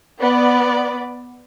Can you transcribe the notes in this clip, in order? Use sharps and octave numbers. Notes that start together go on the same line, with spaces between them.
B3 D5